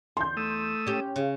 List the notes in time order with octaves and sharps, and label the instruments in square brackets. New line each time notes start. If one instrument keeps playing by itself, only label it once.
[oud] E2 [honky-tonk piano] C6 G6
[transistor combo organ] A3 D#6 E6
[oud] C#4 G4
[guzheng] C#3